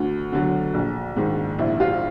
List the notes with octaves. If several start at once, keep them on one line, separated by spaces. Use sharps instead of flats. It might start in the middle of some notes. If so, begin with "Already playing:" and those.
Already playing: D2 D3
D3 F#3
A#1
G#2 D#3
A#1 E4
F4